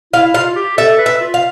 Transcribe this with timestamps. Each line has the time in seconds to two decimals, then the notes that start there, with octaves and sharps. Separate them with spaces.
0.13 E4 F5
0.34 F4 F5
0.56 G4
0.77 A4 E5
0.98 B4
1.06 E5
1.21 F4
1.34 F5